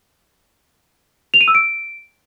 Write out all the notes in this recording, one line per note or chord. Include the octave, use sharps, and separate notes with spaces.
F7
D#7
E6
D7